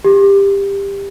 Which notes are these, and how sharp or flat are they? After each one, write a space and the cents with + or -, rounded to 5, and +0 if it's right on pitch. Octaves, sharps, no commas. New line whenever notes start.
G4 +20